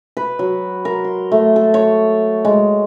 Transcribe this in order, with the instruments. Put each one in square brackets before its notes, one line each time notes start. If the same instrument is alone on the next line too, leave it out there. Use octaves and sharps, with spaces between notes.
[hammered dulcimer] B4
F#3
A#4
C6
A3
A4
C#5
G#3